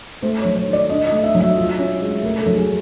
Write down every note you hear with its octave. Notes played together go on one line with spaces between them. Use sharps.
A3 C5
F#3 C#5
C#5
D#3
D5
D4 D#5
D#5
A3
E5
F#3
E5
F4
C#4
G#3
A3 A#4
A4
F#3
G#4